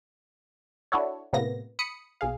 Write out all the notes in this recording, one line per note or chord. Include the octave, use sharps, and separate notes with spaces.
D4 E4 F#4 A4 C#5
A2 C3 A#3 B3 A#6
B5 D#6 C#7
B1 G#4 F5